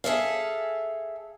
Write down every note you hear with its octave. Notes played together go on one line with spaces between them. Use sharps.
G#4 A4 E5 F5